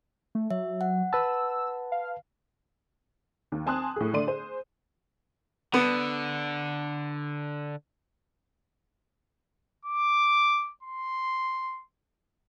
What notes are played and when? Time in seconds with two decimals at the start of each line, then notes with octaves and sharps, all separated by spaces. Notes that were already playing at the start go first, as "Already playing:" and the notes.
0.35 A3
0.51 F#3 E5
0.81 F#5
1.13 B4 A5 E6
1.92 F5
3.52 D#2
3.66 C4 G#5 A5 C6 D#6 F#6
3.96 A2 G#4
4.13 D3 A3 D5 C6 D#7
4.27 G#4 C5
5.74 D3 B3
9.85 D6
10.83 C6